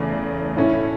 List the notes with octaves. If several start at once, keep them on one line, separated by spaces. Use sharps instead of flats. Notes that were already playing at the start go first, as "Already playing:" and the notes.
Already playing: E2 C#3 A3
A2 A3 C#4 E4